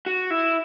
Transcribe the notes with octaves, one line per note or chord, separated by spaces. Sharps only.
F#4
E4